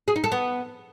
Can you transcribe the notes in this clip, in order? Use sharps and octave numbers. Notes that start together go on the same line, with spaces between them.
G#4
D#4
A4
B3